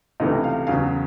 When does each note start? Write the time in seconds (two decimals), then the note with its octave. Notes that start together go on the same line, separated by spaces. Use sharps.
0.20 C#2 C3 E3 A3 D#5
0.44 F5
0.67 E2 C#3 F#3 F5